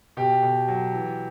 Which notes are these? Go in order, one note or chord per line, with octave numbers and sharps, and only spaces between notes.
B2 G4
B2
F#3
E3